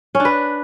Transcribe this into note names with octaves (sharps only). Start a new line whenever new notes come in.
C#4
D4
B4